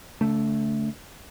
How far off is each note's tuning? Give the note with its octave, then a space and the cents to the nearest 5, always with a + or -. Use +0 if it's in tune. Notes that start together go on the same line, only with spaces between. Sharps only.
D3 -40 A3 +0